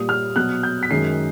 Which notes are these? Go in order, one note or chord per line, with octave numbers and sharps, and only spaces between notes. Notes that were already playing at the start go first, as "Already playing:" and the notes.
Already playing: A#2 G3 D#6
F6
B2 F#3 F#6
G6
B6
F#2 D#3 G#3 C7